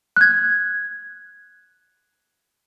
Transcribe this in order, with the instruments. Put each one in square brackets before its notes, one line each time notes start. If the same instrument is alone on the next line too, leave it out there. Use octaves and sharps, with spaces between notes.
[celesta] F#6 G#6